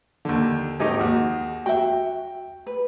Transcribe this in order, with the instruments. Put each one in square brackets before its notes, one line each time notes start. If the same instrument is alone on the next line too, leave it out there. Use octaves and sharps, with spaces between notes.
[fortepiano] D#2 D3
[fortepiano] G#1 D#4 G4 [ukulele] G#4
[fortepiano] D#2 F#4
[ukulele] F#4 E5 [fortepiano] G5
[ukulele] B4